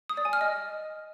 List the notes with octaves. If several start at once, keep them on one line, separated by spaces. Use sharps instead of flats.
D#6
D5
G#5
F6
D#5